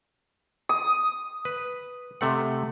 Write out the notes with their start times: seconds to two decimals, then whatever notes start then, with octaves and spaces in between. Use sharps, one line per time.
0.69 D#6
1.45 B4
2.21 C3 A3 F#5